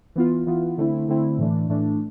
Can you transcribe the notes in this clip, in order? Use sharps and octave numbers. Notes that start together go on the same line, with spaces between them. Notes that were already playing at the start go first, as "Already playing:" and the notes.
E3 B3 F4
E3 B3 F4
D3 A3 C4 E4
D3 A3 C4 E4
A2 E3 A3 D4
A2 E3 A3 D4